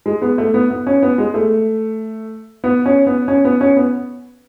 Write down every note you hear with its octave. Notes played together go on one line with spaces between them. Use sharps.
G#3
B3
A3
B3
B3
C#4
B3
G#3
A3
B3
C#4
B3
C#4
B3
C#4
B3